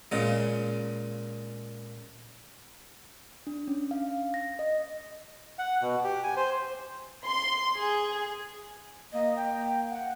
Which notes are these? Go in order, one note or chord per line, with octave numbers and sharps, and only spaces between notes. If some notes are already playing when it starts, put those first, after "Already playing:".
A#2 C#3 G#3
D4
C#4
F5
A#6
D#5
F#5
B2
G4
G#5
C5
C6
G#4
A#3 D#5
G5
F#5